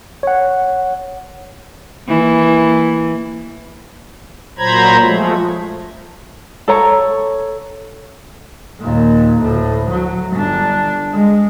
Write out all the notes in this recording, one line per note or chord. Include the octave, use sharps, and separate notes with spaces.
C#5 F#5
E3 A#3
A#2 F#3 C5 A#5 B5 G#6
F3 G#3 A3
A4 C#5 A#5
D#2 A#2
D2 A2
F#3
G1 D4
G#3